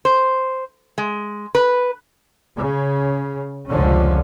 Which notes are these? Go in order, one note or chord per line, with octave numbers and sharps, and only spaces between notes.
C5
G#3
B4
C#3
F1 C#2 D3 F3 C#4